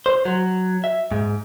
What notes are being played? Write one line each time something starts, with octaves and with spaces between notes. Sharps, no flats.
C5
F#3
E5
G#2